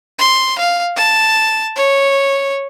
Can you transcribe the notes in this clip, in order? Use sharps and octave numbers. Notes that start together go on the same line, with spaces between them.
C6
F5
A5
C#5